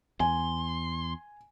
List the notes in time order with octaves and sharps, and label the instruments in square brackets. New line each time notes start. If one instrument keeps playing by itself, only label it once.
[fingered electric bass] E2 [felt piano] G#5 [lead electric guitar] C6